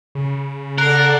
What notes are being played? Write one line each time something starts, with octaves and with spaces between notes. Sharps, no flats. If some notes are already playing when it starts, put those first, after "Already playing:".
C#3
A4 A#4 D5 F#5 F#6 C7